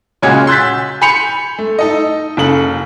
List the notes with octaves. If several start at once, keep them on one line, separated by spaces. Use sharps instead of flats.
A#2 C#3 G#3 C#4 F#4 G#6
C6 E6 F#6 G6 A6 B6
G#5 B5 C6 G6 C#7 F7
A3
D#4 A4 D#5
F#1 C#3 A4 F#7